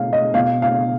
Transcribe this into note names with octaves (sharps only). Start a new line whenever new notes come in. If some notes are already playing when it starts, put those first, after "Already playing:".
Already playing: B2 F5
D#5
B2 F5
F5